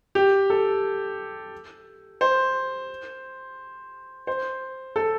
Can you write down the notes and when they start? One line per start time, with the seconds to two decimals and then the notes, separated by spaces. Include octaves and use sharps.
0.15 G4
0.50 A4
2.21 C5
4.27 C5
4.96 A4